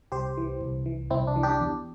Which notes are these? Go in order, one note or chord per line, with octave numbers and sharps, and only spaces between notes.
C2 G4 C5
E3
C2
E3
C2 C4 E4
D4
E3
D4 G4
E2